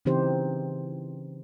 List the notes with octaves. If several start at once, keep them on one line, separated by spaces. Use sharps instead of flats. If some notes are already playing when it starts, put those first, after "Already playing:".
C#3 E3 C4 D#4 G4 C5